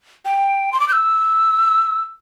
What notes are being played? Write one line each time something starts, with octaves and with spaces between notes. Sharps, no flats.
G5
C6
D6
G6
E6